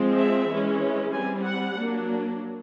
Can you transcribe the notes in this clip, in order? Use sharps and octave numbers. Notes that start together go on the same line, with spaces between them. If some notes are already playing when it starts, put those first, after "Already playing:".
Already playing: F3 G#3 C4
E5
E3 G#3 C#4
G3 C4 G#5
F#5
F#3 A#3 D4